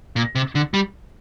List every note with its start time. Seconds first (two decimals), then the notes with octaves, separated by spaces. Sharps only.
0.16 A#2
0.35 C3
0.55 D3
0.74 G3